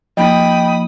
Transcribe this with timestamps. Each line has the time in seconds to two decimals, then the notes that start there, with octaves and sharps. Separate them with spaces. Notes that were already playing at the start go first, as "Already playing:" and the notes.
0.17 F3 A#3 D#4 D#5 G5 B5 D#6